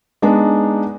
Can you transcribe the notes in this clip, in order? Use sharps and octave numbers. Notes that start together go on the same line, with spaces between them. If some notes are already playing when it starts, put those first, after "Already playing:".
G#3 B3 D4 D#4